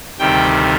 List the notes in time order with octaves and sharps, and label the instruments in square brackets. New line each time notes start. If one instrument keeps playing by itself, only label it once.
[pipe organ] D2 C3 D#3 G3 G5